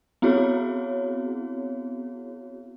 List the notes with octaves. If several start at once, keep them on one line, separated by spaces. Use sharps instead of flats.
B3 C4 E4 F#4 G#4 C#5